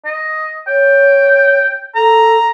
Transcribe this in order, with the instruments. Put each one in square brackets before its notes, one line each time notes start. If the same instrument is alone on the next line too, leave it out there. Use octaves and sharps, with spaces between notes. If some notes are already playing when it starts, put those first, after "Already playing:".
[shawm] D#5
[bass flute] C#5 [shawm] G5
[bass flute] A4 [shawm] A#5